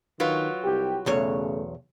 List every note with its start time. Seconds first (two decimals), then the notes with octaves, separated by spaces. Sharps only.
0.20 D#3 F#3 F4 B4
0.63 C2 G4
1.06 B1 E2 C#3 A3 C#5